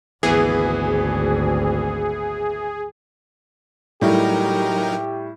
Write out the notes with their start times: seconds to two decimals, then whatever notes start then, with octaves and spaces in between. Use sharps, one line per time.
0.23 G#1 D2 E3 B3 G#4 B4
4.02 A2 F#3 G3 D#4 G4 A#4